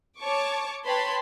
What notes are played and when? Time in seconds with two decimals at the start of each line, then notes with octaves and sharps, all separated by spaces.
0.20 C#5 A5 C#6 D6
0.86 B4 C#5 G5 A5 B5 C6